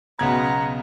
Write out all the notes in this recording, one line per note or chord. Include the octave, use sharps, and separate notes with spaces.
B1 C#3 B3 A#5 G#6